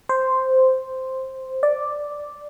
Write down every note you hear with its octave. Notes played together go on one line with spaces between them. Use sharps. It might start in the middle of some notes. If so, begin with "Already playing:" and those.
C5
D5